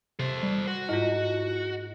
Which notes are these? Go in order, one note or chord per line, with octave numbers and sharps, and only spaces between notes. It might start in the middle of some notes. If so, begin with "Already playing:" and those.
C3 A4 C5
G3
F#4
G#2 A#3 E4 F4 D#5